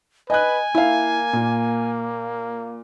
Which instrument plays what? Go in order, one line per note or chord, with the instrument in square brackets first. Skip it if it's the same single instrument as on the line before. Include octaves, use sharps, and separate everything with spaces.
[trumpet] B4 [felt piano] D#5 F#6 [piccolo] G#5
[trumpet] A#3 [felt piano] E4 F5
[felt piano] A#2